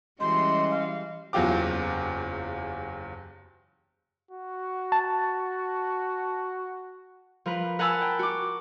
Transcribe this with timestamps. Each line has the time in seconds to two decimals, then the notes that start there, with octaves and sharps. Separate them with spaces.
0.20 E3 G3 G#3 C#4 F#4 D#5 C6
0.71 F5
1.33 F#1 E2 F#3 F4 G4 D6
4.31 F#4
4.92 A5
7.46 F3 A#4 B4
7.79 A#4 F#5 G#5 A5 B5 E6
8.02 G5
8.19 F#4 D6